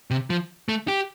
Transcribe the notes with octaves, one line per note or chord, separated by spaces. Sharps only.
C3
F3
A3
G4